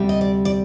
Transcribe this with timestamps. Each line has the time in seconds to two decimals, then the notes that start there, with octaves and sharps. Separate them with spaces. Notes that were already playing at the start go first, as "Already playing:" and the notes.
Already playing: D2 C3 G3
0.09 D#5
0.21 D5
0.45 D5